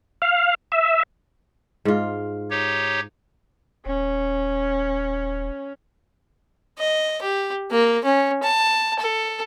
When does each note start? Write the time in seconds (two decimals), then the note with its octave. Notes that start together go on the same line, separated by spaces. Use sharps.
0.22 F5
0.72 E5
1.85 G#2 F4
2.50 D#4 G4 C#5
3.86 D#1 C#4
6.79 D#5
7.23 G4
7.71 A#3
8.05 C#4
8.43 A5
8.99 A4